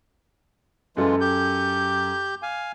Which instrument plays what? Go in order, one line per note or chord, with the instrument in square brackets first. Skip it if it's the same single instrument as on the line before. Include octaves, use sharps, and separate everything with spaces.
[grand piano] F#2 A4 [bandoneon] E3 G#3 F4
[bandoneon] G4 G6
F5 G#5